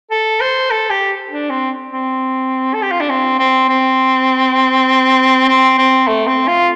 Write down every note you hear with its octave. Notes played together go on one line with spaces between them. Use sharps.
A4
C5
A4
G4
D4
C4
C4
A4
G4
F4
D4
C4
C4
C4
C4
C4
A3
C4
F4